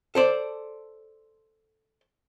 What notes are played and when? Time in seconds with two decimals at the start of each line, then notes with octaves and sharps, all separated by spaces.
0.15 A4 C5 D5